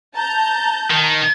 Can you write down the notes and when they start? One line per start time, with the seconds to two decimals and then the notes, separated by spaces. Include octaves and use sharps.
0.15 A5 A#5 G6
0.90 D#3